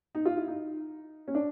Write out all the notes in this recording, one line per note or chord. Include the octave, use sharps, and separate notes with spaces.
D#4
F4
E4
D#4
C#4
D4